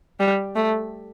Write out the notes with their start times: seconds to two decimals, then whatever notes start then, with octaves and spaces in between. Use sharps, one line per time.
0.20 G3
0.56 A3